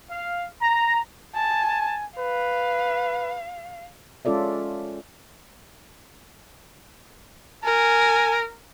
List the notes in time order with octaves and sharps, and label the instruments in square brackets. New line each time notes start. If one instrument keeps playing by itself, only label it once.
[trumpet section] F5
A#5
[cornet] G#5 [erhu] A5
[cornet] B4 [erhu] F5
[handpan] G#3 C#4 F4 A4 D5 E5
[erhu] A#4 [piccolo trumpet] G#5